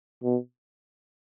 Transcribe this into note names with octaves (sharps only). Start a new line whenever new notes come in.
B2